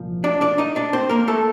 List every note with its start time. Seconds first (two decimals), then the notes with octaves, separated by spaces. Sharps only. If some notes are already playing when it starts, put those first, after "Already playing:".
Already playing: C2 A#2 F3
0.24 D4 D5
0.41 D4 D5
0.58 D#4 D#5
0.76 D4 D5
0.93 C4 C5
1.09 A#3 A#4
1.27 A3 A4